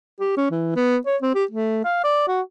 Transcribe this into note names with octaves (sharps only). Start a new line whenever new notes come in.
G4
C#4
E3
B3
C#5
C4
G4
A3
F5
D5
F#4